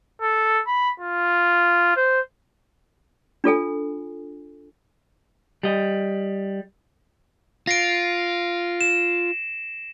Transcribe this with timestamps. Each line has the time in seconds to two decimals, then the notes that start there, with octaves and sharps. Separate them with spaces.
0.22 A4
0.67 B5
1.00 F4
1.96 C5
3.44 D4 F4 A4 G#5
5.63 G3 D#5
7.67 F4 A#6 C7 D7
8.81 E7